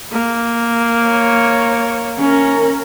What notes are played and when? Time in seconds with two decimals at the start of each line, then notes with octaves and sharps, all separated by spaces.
0.12 A#3
1.07 C#5
2.19 C#4 A#4